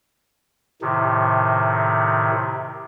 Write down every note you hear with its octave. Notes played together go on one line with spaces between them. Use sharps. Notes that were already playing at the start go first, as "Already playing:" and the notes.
A2 C3 D#3